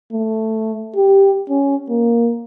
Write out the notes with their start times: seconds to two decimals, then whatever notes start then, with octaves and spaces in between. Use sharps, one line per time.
0.12 A3
0.96 G4
1.49 C#4
1.89 A#3